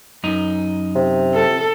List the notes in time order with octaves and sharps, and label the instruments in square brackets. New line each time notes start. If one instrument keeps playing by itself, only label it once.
[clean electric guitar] F#2 D#4
[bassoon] C3
[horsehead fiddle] A4